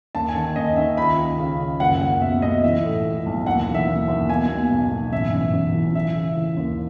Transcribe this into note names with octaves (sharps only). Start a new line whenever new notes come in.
D#2 A5
G#5
D#3
D#2 D#5
D#3 E5
C#2 B5
C#2
C#3
C#2
F#1 F#5
F#1 F#5
B2 E5
B2 D#5
E3 E5
A2
E3
B1
D#2 F#5
E3
E5
D#2
D#2
B2 G#5
B2
B1
B1
A1 E5
A1
A1
E3
E3 E5
C#3
E3
D#2